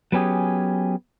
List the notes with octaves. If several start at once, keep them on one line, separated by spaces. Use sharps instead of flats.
F#3 B3 C#4 G4 G#4